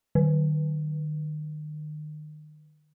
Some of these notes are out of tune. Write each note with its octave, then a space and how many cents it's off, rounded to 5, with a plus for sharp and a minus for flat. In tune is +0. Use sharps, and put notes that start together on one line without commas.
D#3 -40